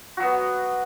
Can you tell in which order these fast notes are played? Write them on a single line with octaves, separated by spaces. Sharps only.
F#4 F#3 B3